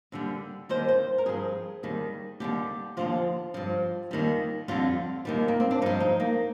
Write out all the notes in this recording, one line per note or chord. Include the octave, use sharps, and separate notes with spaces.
D#2 D3 G3
D#2 D#3 G3 C5
C5
A#4
G2 F3 G#4
D#2 D#3 G3
D#2 D3 G3 G4
D#2 D3 F3 F4
G2 F3
D#2 D#3 G3
F2 D3 G3 F4
D#2 D#3 G3
A#3
C4
D4
G2 F3 D#4
D#4
A#3